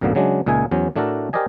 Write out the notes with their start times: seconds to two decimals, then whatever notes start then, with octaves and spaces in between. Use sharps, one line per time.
0.01 B1 F#2 A2 D3 A#3 B3
0.15 C#3 F#3 G#3 D4
0.46 C#2 A#2 D#4 G#4 E5 G#5
0.71 E2 F#3 C#4 C5
0.96 A2 A3 D4 F#4 A4 A#4
1.33 G4 A#4 C5 D5 D#5 G#5